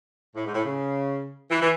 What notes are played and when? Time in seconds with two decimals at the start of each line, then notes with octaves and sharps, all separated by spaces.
0.35 A2
0.45 G#2
0.54 A2
0.65 C#3
1.51 E3
1.61 E3